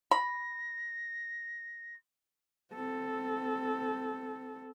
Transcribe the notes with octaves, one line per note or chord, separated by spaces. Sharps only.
B5 A#6
C4 A4